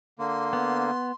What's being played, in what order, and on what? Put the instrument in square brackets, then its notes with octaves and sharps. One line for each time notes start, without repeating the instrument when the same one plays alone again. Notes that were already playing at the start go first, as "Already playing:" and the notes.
[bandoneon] D3 A#3 [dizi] C6
[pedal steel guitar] B3